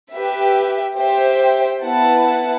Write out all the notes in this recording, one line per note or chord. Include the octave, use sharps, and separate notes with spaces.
G4 B4 E5
G4 C5 E5 G5
B3 E4 B4 F#5 A5